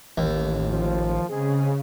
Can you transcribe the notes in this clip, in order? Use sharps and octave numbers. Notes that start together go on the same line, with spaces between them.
A1 D#2
F3
C#3 G#3 C4 G#4